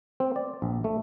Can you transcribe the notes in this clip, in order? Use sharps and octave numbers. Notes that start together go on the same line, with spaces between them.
C4
D5
A#1
A3